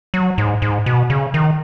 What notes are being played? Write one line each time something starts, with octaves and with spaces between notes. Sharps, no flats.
F#3
G#2
G#2
B2
C#3
D#3